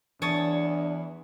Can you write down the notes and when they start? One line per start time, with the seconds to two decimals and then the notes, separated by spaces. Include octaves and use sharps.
0.22 E2 E3 D4 C#5 A5 D#6